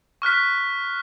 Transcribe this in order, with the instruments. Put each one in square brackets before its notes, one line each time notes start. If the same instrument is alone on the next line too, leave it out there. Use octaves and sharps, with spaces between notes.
[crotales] C#6 F6 F#6 B6